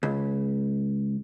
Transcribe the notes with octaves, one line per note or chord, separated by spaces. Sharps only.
C#2